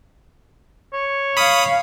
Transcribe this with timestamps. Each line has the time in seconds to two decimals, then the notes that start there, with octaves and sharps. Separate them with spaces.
0.94 C#5
1.37 F5 B5 D#6